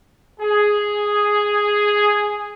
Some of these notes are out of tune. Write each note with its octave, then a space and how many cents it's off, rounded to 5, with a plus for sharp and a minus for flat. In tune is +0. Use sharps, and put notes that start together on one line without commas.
G#4 +0